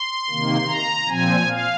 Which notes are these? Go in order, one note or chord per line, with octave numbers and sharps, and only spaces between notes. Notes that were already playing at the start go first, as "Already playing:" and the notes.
Already playing: C6
C3 D#3 A#3
A#5
A#2 F3 C4 G#5
F5